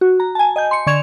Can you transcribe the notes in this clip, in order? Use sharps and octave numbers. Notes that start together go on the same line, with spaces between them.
F#4
A#5
G#5 A5
D#5 G#5 G6
C6 C#7
D3 D5 C#6 G#6 E7 F7